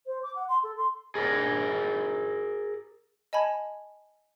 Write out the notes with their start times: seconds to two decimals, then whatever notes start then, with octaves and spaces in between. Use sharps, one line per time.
0.06 C5
0.23 D6
0.36 F#5
0.49 C6
0.63 A4
0.77 C6
1.15 G#4 A#4 D5
3.33 D#5 G#5 A5 B5 G#6